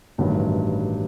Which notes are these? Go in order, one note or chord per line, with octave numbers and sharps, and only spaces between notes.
A1 G2 D#3 F#3